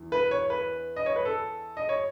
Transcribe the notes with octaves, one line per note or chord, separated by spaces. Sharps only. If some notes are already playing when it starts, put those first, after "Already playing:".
Already playing: E2 E3
B4
C#5
B4
D#5
C#5
B4
A4
D#5
C#5